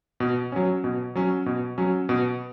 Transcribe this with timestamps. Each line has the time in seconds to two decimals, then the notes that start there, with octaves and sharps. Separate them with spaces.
0.20 B2
0.52 F#3 C#4
0.84 B2
1.15 F#3 C#4
1.46 B2
1.78 F#3 C#4
2.09 B2